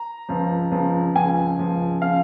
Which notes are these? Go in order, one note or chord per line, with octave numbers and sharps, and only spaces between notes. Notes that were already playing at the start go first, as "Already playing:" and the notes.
Already playing: A#5
C#2 C#3 F3
C#2 C#3 F3
C#2 C#3 F3 G#5
C#2 C#3 F3
C#3 F3 F5